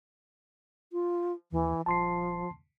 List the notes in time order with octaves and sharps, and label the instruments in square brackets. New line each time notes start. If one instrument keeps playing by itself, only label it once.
[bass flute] F4
[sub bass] D#2 [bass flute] E3
[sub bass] D#1 [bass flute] F3 [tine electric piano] A5 C6 C7